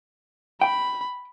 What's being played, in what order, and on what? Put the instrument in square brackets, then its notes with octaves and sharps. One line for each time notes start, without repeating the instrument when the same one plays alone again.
[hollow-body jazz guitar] G5 [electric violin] B5